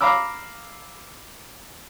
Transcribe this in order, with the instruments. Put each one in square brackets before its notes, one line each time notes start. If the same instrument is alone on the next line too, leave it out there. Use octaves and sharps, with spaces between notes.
[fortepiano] F5 A#5 B5 D6 E6